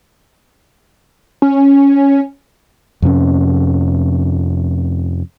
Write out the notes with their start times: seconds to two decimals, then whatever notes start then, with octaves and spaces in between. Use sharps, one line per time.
1.42 C#4
3.02 F2 C3 B3 C#4